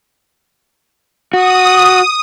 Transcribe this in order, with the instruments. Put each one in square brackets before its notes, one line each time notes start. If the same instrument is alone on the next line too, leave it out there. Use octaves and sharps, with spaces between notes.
[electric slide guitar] F#4 [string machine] D#6